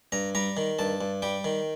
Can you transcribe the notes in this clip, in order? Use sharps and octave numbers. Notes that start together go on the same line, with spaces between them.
G2 A#5
G3 A#5
D#3
G2 A5
G2
G3 G5
D#3